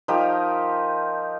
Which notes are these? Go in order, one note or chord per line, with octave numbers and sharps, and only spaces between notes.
F3 D#4 G4 A#4